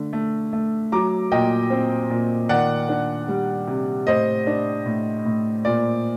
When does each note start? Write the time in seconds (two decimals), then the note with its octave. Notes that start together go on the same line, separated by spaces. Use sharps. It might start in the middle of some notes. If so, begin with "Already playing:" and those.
Already playing: D3 A3
0.13 A3
0.53 A3
0.92 F#3 A#5 D6
1.31 A#2 D#5 G5
1.70 C4
2.10 A#2
2.49 D#3 D5 F#5
2.89 D4
3.28 G3
3.67 C3
4.07 A2 C5 D#5
4.47 D4
4.86 A2
5.25 A2
5.65 A#2 D5